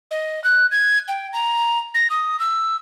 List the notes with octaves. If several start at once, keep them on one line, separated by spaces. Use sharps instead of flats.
D#5
F#6
G#6
G5
A#5
A#6
D#6
E6